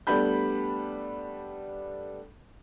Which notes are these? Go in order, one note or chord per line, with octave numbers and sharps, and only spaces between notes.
G3 A3 B3 D4 B5 G6